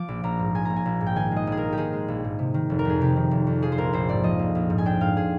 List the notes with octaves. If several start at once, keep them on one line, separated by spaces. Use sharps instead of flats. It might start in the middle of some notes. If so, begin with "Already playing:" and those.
Already playing: F3 D6
A#1
A#1 A#5
G#2
F3 G#5
A#1 A#5
G#5
A#1
G#2
G5
D#3 G#5
G#3
D#5
A#1 G#4
A#4
G#2
G4
D#3 G#4
G#3
A#1
G#2
C3
D#3
F1
A#4
F2 G#4
C3 G4
D#3
F1
F2
F3 G#4
C5
A#1 A#4
A#1 C5
G#2 D5
F3 D#5
A#1
A#1
G#2
G#5
D4 G5
G#2 F5
G#4